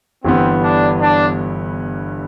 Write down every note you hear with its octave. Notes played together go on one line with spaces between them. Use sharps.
G1 G2 E3 G3 B3 C4
D4
D4